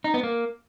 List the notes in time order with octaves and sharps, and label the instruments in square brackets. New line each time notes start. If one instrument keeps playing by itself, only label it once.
[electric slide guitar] D#4
B3
A#3